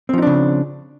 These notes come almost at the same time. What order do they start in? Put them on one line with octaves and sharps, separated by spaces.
C4 F3 D#4 D4 C#3